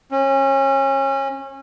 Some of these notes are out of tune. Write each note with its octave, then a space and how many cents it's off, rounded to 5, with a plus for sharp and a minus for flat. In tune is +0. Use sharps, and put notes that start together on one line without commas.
C#4 -30